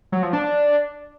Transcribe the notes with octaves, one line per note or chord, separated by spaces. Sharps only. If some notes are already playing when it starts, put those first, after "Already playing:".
F#3
F3
D4